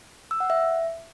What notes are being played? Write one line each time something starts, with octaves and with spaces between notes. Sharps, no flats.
E6
F#5
E5